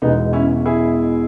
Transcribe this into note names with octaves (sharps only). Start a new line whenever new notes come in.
E1 E2 B2 G#3 B3 D#4
C#4 E4
E4 G#4